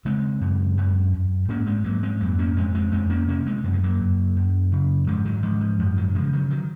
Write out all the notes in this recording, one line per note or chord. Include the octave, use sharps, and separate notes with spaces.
C#3 G#3 C4
F#2
F#2
F#2
G#2 A#3 C#4
G#3 C4
G#2 F#3 A#3
G#3 C4
F2 F#3 A#3
A#3 C#4
F2 G#3 C4
G#3 C4
F2 G#3 C4
A#3 C#4
C3 A#3 C#4
G#3 C4
F#2 A#3
G#3
F#3 A#3
F#2
F#2
C#3
G#2 F3 G#3
D#3 F#3
G#2 F3
F3
F#2 F3
D#3 F#3
C#3 F3 G#3
D#3 F#3
D#3 F#3